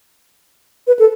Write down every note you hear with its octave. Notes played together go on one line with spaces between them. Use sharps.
B4
A4